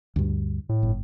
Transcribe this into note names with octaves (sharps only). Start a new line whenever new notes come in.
D2 G2
A2
G1